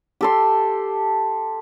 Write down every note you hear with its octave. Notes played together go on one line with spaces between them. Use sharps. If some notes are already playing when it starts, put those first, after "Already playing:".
G4 A4 C6